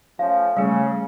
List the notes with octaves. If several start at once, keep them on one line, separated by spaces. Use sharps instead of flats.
F3 A3 C#4 F5
C#3 G3 A3